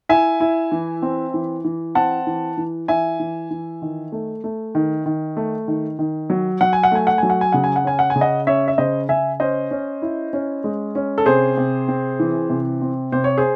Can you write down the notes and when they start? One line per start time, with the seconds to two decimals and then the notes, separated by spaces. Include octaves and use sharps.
0.09 E4 E5 G#5
0.40 E4
0.72 E3
1.02 C4
1.34 E3
1.65 E3
1.95 C4 F#5 A5
2.27 E3
2.57 E3
2.88 E3 E5 G#5
3.20 E3
3.51 E3
3.82 D#3
4.12 A3
4.44 A3
4.75 D#3
5.06 D#3
5.37 A3
5.68 D#3
5.99 D#3
6.30 F#3
6.61 F#3 F#5
6.73 G#5
6.83 F#5
6.92 A3 G#5
7.07 F#5
7.18 F#3 G#5
7.30 F#5
7.41 G#5
7.52 C#3 F#5
7.64 G#5
7.76 F#5
7.85 C#4 G#5
7.99 F#5
8.10 G#5
8.16 C#3
8.21 D#5 F#5
8.47 C#4 C#5 E5
8.68 E5
8.78 C#3 C5 D#5
9.09 C#3 E5 G#5
9.40 C#4 C5 D#5
9.71 C#4
10.02 E4
10.33 C#4
10.64 G#3
10.95 C#4
11.18 A4
11.26 C3 G#4 C5
11.57 C3
11.88 C4
12.19 E3
12.50 C3
12.81 C4
13.12 C3 C5
13.24 C#5
13.38 G#4 C5